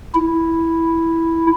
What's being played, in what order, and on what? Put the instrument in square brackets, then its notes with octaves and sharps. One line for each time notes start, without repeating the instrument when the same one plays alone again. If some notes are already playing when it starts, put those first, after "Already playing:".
[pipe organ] E4